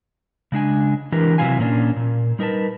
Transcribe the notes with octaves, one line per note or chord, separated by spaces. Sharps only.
C#3 G#3 D4 G#5
E3 D4 G4 A#4
C3 E3 F#3 E4 F5 G#5
A#2 A#3 C#4 D4
A#2
G3 D#4 A#4 B4 A5